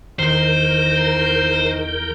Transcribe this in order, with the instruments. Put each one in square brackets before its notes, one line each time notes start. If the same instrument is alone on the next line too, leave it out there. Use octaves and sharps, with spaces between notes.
[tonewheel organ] E2 A#4 G6 [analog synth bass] D#3 [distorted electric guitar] C5